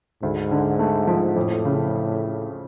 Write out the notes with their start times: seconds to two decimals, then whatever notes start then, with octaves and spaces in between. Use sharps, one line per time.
0.22 D2 G#2
0.51 D3
0.79 A3
1.07 F3
1.36 F2 A2
1.65 C#3